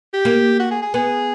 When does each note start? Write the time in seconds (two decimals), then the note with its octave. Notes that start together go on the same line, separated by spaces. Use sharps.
0.13 G4
0.25 A#3
0.59 F#4
0.71 G#4
0.82 G#4
0.94 B3 G#4